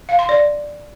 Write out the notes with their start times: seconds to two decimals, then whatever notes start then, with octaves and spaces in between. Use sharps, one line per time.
0.09 F5
0.19 C6
0.29 D5